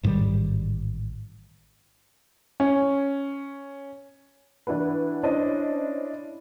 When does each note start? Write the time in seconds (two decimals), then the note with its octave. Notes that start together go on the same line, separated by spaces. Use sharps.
0.03 A1 G#2 D#3 G3
2.60 C#4
4.67 E3 D4 E4 F#4 B4
5.23 C#4 D4 E4 C5 D#5